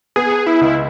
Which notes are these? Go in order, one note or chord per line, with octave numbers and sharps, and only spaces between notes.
B3 G#4
E4
C#2